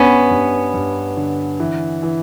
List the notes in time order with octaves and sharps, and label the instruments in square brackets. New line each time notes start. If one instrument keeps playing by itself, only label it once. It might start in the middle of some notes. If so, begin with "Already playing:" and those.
Already playing: [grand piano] G2 [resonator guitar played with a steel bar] B3 C#4
[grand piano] G2
G2
D3
E3
E3